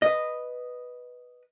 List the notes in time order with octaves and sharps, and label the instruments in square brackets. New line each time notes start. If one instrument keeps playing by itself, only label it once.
[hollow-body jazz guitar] B4 D#5